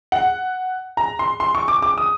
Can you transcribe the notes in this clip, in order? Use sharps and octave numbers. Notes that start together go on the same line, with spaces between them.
F#5
A#5
C6
C6
C#6
D6
D6
D#6